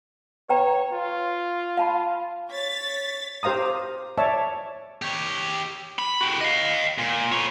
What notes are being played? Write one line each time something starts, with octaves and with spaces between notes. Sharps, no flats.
B4 C#5 G5 A#5
F4
F5 A5 B5
C#5 A6 B6
G4 C5 F5 A#5 D#6
C#5 D5 E5 A5
G4 C#5
B5
F#4 G4
D#5 F5
A#2
B4 C#5